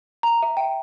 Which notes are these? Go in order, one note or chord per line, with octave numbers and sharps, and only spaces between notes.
A#5
E5
G5